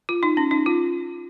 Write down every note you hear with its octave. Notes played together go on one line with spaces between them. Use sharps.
F4
D#4
C#4
D#4
F4